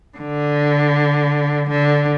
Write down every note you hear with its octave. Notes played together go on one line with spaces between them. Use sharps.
D3
D3